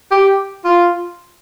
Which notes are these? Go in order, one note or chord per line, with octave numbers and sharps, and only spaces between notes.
G4
F4